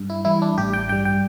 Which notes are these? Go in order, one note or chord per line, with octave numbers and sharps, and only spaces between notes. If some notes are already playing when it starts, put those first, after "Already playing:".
Already playing: G2
E4
E3 G3 E4
D4
A1 G4
G5
G2 G3 G5
G5